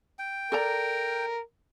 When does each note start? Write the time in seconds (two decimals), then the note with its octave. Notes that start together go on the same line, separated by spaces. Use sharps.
0.19 G5
0.52 A4 A#4 D5 A#5